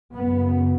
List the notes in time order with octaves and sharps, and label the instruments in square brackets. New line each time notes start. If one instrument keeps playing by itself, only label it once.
[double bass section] F#2 C#3 B3